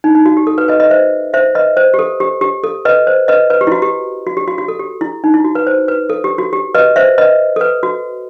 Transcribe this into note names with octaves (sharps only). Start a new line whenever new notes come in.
D#4
D#4
F#4
G4
A4
B4
B4 D#5
B4 D#5
C5 E5
C5 E5
B4 D#5
C5
G4
A4
G4
G4
A4
B4 D#5
C5
B4 D#5
B4
G4
E4
F#4
G4
F#4
G4
F#4
F#4
A4
G4
E4
D#4
E4
F#4
B4
C5
B4
A4
G4
F#4
G4
B4 D#5
C5 E5
B4 D#5
A4
B4
F#4